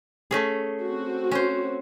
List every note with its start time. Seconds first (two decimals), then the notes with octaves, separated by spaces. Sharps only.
0.31 A3 C#4 G#4
0.82 C4 F#4
1.31 C#4 C5